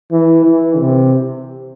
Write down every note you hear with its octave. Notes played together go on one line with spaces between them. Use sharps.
E3
E3
C3